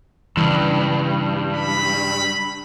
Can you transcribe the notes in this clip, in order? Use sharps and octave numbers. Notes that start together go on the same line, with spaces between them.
G2 C#3 E3
B5